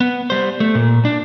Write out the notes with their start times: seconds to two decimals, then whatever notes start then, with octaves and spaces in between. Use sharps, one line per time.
0.01 B3
0.30 G3 C5
0.60 A3
0.75 A#2
1.05 D4